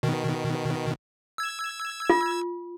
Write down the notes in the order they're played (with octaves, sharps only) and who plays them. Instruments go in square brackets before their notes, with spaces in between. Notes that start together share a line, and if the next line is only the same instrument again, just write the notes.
[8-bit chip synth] B2 D#3
E6 G#6
[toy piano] F4